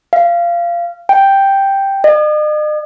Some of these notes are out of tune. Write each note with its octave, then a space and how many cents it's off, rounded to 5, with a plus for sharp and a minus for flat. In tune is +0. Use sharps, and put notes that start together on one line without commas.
F5 -20
G5 +0
D#5 -45